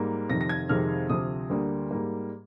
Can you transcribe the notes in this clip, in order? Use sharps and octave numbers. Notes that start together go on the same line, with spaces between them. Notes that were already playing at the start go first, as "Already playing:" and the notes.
Already playing: G#2 G3 A#3
F2 C3 D#3 A#6
A#6
G#6
F2 C3 D#3 G#3 F6
D2 C3 F3 D#6
D2 D3 G3 A#3
G#2 G3 A#3